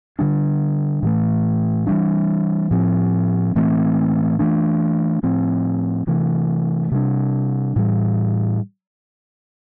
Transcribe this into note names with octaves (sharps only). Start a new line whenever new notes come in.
D3 G3 D4
A2 E3 A3
E3 G3 D4
A2 F3 C4
A2 E3 A3 C4
E3 A3 D4
A2 F3 C4
C3 E3 A3
C3 G3 D4
A2 E3 G3